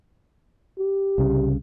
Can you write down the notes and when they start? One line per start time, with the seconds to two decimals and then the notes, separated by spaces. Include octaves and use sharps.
0.79 G4
1.18 C2 C#3